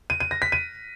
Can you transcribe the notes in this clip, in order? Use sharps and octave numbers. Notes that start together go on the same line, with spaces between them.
D#7
D#7
A#6
B6
D#7